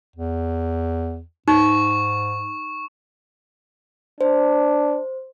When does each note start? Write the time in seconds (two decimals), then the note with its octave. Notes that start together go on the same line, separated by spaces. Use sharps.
0.16 E2
1.48 G#2 D#4 C#6
4.21 D4 C5